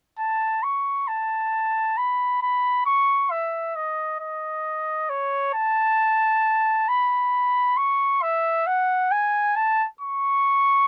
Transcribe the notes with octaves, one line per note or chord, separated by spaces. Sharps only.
A5
C#6
A5
B5
B5
C#6
E5
D#5
D#5
C#5
A5
B5
C#6
E5
F#5
G#5
A5
C#6